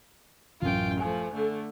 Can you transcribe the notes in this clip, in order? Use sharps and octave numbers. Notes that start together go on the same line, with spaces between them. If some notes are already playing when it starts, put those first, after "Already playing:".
A1 F#2 F4 G5
F3 A3 G#5
D3 A3